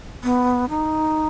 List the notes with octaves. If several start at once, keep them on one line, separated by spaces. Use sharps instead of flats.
B3
D#4